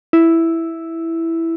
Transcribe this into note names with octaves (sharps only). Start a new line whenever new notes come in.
E4